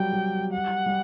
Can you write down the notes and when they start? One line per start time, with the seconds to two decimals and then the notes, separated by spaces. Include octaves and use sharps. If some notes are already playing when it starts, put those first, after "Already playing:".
Already playing: F#3 G3 G5
0.13 G3
0.52 F#5
0.86 G3